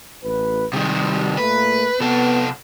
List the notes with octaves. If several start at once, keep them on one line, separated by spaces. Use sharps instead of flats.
A1 B4
C3 D#3 G3
A#2 A3 A#3 B4
C3 B3 A4